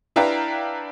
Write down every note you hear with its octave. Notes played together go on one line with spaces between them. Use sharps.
D4 E4 B4 F5 G5 A#5